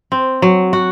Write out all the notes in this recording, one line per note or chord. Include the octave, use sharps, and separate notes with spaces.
C4
F#3
F#4